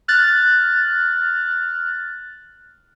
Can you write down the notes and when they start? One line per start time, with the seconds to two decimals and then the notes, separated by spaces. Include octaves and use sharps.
0.08 F6 F#6 A6